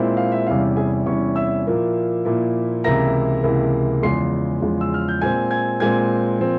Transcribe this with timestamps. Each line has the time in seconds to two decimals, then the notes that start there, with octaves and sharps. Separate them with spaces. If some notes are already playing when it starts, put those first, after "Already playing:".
Already playing: A#2 G#3 C4 E4
0.17 F5
0.32 E5
0.47 E2 C3 G3 C#4 E4 F5
0.76 G#4 G#5
1.06 E2 C3 G3 C#4 E4 C#5 C#6
1.36 E5 E6
1.66 A#2 F3 A#3 E4
2.25 A#2 F3 A#3 E4
2.84 C#2 C3 E3 A#3 E4 A#5 A#6
3.43 C#2 C3 E3 A#3 E4
4.03 E2 C#3 F3 G#3 C6 C7
4.62 E2 C#3 F3 G#3
4.81 E6
4.94 F6
5.08 G6
5.21 A#2 G#3 C4 G#5 G#6
5.51 G#5 G#6
5.80 A#2 G#3 C4 G#5 G#6
6.40 A#2 F3 C4